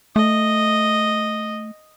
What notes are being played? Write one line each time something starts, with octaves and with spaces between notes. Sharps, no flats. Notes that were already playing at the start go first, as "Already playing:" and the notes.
A3 D#5